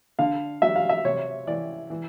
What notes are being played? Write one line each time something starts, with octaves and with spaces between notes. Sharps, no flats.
D3 F5
F#3 E5
F5
E5
C3 C#5
E3 D5
E3